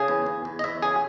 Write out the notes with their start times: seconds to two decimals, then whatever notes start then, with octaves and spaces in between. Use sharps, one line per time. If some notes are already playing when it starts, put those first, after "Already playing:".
Already playing: C#3 G#4
0.08 E2
0.26 E2
0.45 E2
0.59 D#5
0.64 E2 E5
0.82 C#3 G#4